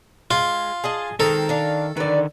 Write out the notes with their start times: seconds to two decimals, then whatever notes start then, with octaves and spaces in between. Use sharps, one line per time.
0.31 G#3 F4
0.84 G#4 D#5 A5
1.20 D#3 G#3 C4 A4 A#4
1.49 D4 F5
1.97 D3 D#3 B4 D5